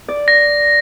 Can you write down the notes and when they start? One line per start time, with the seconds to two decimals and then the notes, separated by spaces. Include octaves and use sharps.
0.08 D5
0.28 A#6